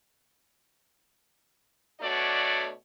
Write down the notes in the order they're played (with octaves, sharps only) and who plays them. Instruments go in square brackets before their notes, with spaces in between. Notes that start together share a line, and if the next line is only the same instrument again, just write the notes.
[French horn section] B2 A3 D4 F#4 C#5 D5